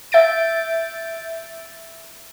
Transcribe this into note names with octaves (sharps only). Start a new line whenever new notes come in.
E5 G6 A6 D7